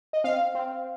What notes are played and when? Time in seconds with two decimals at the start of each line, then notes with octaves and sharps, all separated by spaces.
0.13 D#5
0.24 C4 F5
0.55 C4